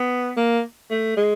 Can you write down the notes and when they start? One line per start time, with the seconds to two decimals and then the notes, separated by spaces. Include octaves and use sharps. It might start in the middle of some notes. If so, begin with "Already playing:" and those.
Already playing: B3
0.37 A#3
0.91 A3
1.17 G#3